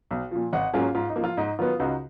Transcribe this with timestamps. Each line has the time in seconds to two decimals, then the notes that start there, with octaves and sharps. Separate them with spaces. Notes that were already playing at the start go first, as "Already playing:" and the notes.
0.11 B1
0.31 A#2 F3
0.53 G#1 D#5 F#5
0.74 G#2 F#3 A#3 C#4 F4 G#4
0.95 G#2 F4
1.10 D#4
1.16 F3 A#3
1.24 F4
1.37 G#2 D#4
1.59 D#3 F#3 B3 F4
1.80 C#2 D#4 F#4